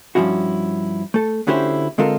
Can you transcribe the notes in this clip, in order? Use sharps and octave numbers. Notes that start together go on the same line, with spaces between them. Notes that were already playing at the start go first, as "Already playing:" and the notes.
G2 A#2 F3 C#4 E4 F#4
A3 A4
D2 D3 C#4 E4 G4 C5
D3 G#3 C4 F4 A4 A#4